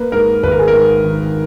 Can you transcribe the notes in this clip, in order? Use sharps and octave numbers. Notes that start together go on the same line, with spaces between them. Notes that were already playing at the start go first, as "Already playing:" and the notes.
Already playing: A#3 B4
G#2 A#4
G#1 B4
A#4
G#4
A#4
G#2
D#3